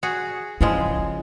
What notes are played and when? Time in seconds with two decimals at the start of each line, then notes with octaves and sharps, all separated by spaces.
0.03 F#4 G#4
0.61 C#3 F3 G#3 E4